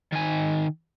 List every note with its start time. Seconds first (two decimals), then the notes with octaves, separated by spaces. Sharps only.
0.13 D#3 G#5